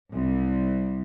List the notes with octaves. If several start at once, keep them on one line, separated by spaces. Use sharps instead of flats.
C2